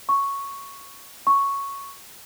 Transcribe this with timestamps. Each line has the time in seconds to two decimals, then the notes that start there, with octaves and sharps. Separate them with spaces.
0.09 C#6
1.27 C#6